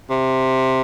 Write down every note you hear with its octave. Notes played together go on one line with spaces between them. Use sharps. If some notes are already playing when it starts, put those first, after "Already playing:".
C3